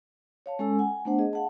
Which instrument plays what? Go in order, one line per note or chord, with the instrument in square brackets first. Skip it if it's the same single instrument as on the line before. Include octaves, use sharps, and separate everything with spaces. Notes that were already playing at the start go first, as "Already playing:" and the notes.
[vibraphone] C#5 F5 A5
G#3 C#4 A4 G#5 E6
F#5 G#5
A3 B3 D4 C5 F#5
G#4 D#5
F5 F#5 A5